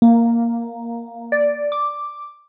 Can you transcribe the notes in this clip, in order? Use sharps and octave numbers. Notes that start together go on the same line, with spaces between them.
A#3
D5
D6